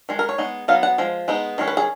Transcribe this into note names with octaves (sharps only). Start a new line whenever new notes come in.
D#3 G#3
A#4
C#5
G#3 B3 D#4
F#3 B3 D#4 F5
F#5
F3 G#3
G#3 B3 D#4
D#3 G#3 C#4
B4
G#4